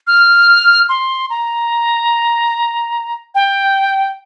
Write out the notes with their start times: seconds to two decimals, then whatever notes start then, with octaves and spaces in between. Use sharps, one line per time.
0.07 F6
0.89 C6
1.30 A#5
3.35 G5